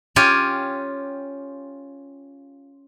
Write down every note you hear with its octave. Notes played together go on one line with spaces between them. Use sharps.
C#4 F4 G4 C#5 G#5